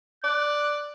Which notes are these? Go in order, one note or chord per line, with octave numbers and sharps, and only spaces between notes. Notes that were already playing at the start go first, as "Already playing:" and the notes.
D5 F#6